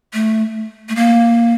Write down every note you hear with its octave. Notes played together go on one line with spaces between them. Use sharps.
A3
A3
A#3